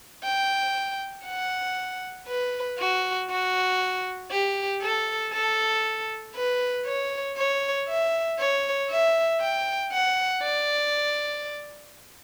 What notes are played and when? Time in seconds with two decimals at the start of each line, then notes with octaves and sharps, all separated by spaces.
0.24 G5
1.26 F#5
2.28 B4
2.79 F#4
3.30 F#4
4.32 G4
4.82 A4
5.33 A4
6.35 B4
6.86 C#5
7.37 C#5
7.89 E5
8.39 C#5
8.90 E5
9.41 G5
9.92 F#5
10.43 D5